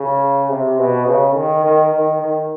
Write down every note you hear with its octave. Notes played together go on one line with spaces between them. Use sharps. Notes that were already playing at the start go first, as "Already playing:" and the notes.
Already playing: C#3
C3
B2
C#3
D#3
D#3
D#3
D#3